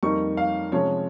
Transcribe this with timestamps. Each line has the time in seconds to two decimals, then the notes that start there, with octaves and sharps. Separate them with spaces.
0.03 F2 D#3 G3 A#3 D#4 C#6
0.37 F5
0.72 C3 F3 G#3 C#4 C#5